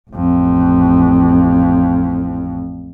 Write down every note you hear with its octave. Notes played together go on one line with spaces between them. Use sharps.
A1 F2